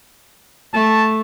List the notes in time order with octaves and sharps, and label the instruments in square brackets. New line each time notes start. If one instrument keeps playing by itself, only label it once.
[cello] A3 [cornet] A5